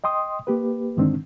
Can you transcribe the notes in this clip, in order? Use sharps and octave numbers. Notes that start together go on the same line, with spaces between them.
D#5 G5 C6 D#6
A#3 G4 B4
G2 D3 D#3 G#3 C4 D4